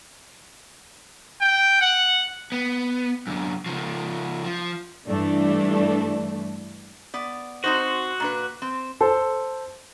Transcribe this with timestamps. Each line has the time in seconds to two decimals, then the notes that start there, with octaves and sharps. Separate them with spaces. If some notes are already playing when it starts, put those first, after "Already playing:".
1.41 G5
1.81 F#5
2.52 B3
3.27 F#2 D3
3.66 C#3 F3
4.45 F3
5.07 G2 E3 A3 D4
7.14 B3 D5
7.64 C4 D#4 F#4 C5
8.20 A#2 D4 B4
8.62 C4
9.01 A4 C5